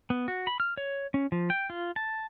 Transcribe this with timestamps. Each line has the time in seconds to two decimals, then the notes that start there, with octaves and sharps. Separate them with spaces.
0.10 B3
0.28 F#4
0.47 B5
0.60 F6
0.77 C#5
1.14 C#4
1.32 F3
1.50 G5
1.70 F4
1.96 A5